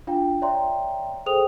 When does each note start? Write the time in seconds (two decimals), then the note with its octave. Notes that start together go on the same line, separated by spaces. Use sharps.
0.07 D4 F4 F5 G5
0.42 C#5 D5 E5 G5 A#5 C6
1.26 G#4 A4 C5 G5 D#6 F7